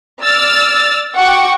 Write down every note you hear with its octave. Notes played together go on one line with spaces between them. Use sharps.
D5 E6 F6 A6
F#4 F#5 G5 C#6 D6